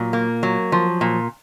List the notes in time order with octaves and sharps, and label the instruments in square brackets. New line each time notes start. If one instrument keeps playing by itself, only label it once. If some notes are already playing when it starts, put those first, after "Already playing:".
Already playing: [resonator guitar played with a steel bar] A#2 F#3
A#3
F#3
F3
A#2